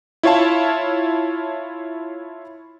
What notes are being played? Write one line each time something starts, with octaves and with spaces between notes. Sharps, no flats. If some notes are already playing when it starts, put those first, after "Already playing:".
E4 F4 C#5 F5 A5